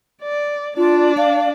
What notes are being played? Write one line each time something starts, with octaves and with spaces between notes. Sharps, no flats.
D5
D4 F4 D5
F5